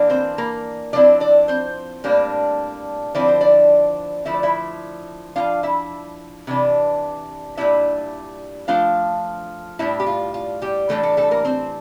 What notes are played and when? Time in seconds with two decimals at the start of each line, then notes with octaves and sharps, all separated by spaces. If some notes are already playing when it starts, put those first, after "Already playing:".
Already playing: E3 A#3 D4
0.10 C4 C5
0.38 A#3 A#4
0.93 F3 C4 D4 E4 D5
1.20 D4 D5
1.48 C4 C5
2.04 A2 G3 A#3 D4
3.15 D3 F3 C4 E4 D5
3.28 C5
3.41 D4 D5
4.25 D3 F3 A3 E4 E5
4.34 D5
4.43 E4 E5
5.36 F3 A#3 D4 F4 F5
5.63 E4 E5
6.47 C3 E3 D4
7.57 A#2 G3 D4 E4 E5
8.68 F3 A3 D4 F4 F5
9.79 A2 G3 D4 E4 E5
10.00 G4
10.07 F4
10.34 F4
10.62 G3 G4
10.89 A2 E3 G3 A3 D4 A4
11.03 A3 A4
11.17 A3 A4
11.31 A#3 A#4
11.45 C4 C5